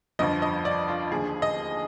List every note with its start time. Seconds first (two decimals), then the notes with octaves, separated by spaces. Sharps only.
0.19 G1 F2 D3 F3 D#5
0.42 D#5
0.65 D5
0.88 F4
1.11 D#2 D3 F3 G#4
1.42 D#5